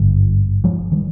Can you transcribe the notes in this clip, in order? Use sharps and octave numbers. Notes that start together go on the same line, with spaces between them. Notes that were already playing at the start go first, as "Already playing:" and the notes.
Already playing: G#1 G2 D3
F3 G#3
D#3 G3